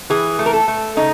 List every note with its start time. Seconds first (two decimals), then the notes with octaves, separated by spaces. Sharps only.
0.10 E3 G#4
0.39 A3
0.46 A#4
0.53 A4
0.68 A3
0.97 C#3 D#4